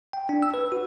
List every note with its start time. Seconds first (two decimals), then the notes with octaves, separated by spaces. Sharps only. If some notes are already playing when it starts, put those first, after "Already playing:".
0.13 G5
0.29 D4
0.42 E6
0.54 B4
0.72 F#4